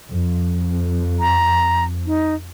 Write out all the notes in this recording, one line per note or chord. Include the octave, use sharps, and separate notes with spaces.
F2
A#5
D#4